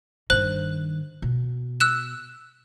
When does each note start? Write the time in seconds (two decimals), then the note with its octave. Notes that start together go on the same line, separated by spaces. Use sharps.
0.30 G2 D#3 C5 F#6 F#7
1.22 B2
1.80 E6 F#6 E7